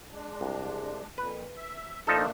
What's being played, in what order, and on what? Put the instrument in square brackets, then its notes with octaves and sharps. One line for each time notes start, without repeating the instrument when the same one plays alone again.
[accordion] G#3 D4
[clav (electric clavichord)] C2
[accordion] F2 A#2 [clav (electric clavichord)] B4
[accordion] E5
[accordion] A#2 A3 D4 [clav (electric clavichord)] F3 D#4 A4